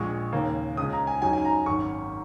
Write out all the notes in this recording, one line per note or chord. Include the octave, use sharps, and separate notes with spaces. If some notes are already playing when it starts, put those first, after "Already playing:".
Already playing: A#1 A#2 G#3 C#6
D#2 C#3 A#3
C#2 C#3 G#3 D#6
A#5
G#5
F#2 F#3 D#4 G#5
G#5
A#5
G#1 F#2 D#3 C#6